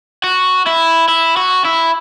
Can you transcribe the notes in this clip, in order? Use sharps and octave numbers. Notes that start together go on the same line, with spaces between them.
F#4
E4
E4
F#4
E4